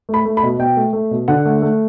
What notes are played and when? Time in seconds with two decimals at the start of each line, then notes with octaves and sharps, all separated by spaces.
0.09 A3
0.14 B5
0.25 A3
0.37 B5
0.43 B2
0.59 B2 G5
0.76 A3
0.93 A3
1.11 B2
1.28 D3 F#5
1.45 A3
1.62 A3